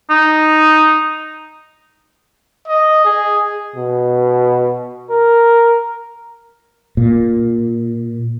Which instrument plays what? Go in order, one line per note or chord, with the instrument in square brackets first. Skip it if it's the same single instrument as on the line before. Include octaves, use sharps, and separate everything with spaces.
[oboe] D#4
[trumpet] D#5
G#4
[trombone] B2
A#4
[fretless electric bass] A#2